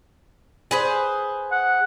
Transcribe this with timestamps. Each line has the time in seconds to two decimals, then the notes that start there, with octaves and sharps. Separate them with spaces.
0.71 G#4 B4 C5
1.52 F#5